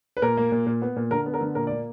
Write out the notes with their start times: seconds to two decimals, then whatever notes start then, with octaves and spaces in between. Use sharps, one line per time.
0.17 B4
0.22 A#2 A#4
0.37 A#3
0.52 A#2
0.66 A#2
0.82 B3
0.96 A#2
1.11 D3 A#4
1.26 B3
1.34 A#4
1.41 D3
1.55 A#2 A#4
1.67 A#3 D5